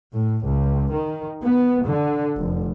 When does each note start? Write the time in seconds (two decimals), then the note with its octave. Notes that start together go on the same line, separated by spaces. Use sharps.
0.12 A2
0.44 C#2
0.92 D#3
1.44 B3
1.86 D3
2.37 F1